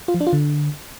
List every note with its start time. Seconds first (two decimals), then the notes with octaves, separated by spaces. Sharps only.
0.08 F4
0.14 F3
0.21 D4
0.27 F4
0.33 D3